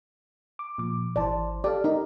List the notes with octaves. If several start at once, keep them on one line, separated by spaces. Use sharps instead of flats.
D6
A#2 F3 D6
G#1 E3 C5 D5 A5
G4 A4 D5 F5
D#4 G4 A#4